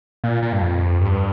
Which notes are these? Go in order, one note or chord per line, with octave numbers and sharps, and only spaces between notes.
A#2
A#2
G2
F2
G2